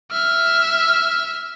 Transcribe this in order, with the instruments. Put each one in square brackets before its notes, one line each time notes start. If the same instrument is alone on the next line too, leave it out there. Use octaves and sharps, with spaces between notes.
[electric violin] E5 F6